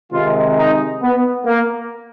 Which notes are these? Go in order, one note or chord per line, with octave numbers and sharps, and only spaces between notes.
C3 D#3 G#3 F4
D#4
B3
A#3